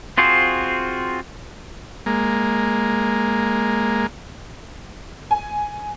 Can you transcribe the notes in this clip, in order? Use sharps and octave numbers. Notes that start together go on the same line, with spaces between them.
C4 F4 F#4 G#4 C5
G#3 A#3
G#5